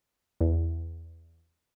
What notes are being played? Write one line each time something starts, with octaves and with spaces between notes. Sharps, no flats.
E2